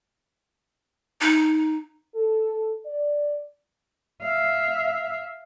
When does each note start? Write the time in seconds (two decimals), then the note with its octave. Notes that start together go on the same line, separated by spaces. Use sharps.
1.21 D#4
2.15 A4
2.86 D5
4.22 E5 F5